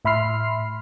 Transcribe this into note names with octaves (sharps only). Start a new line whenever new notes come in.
A2 E5 B5 C6 F6 C7